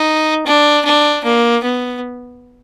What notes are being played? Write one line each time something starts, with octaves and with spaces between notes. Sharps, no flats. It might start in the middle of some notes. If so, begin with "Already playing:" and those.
Already playing: D#4
D4
D4
A#3
B3